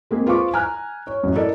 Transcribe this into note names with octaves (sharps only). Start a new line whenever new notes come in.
G#3 A#3 C4 G#4
F4 B4 C5 F5 C#6 D6
G#5 A#5 F6 F#6
C#5
A1 F#2
E4 A4 A#4 D5 D#5